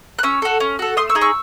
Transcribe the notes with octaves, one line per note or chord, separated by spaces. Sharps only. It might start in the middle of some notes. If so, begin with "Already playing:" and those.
F#6
C#4 C#6 E6
F#4 A4
C#4
F#4 A4
A3 C6 D#6
C#6 E6
D#4 G#4
C#6 E6